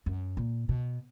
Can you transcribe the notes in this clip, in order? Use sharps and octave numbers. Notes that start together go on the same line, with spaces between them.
F#2
A#2
B2